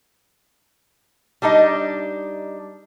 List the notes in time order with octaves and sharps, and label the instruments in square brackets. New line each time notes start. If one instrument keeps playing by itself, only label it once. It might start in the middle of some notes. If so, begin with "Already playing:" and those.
[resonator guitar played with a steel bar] G3 D4 D#4 D#5